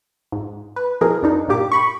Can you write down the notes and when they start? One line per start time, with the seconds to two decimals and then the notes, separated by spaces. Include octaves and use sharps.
0.32 G#2
0.76 B4
1.01 B2 E3 F3 G#4 A#4
1.23 F#2 D4 D#4
1.48 G2 A#2 A#3 G4 D6
1.72 B5 C#6